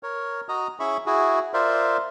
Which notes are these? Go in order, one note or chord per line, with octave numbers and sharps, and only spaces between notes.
A#4 C#5
F#4 D#5 A#5 D#6
C#4 E4 G#4 E5 B5 C#6
E4 F#4 G#4
F4 A#4 C5 D5 E5